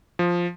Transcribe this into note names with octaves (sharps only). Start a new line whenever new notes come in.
F3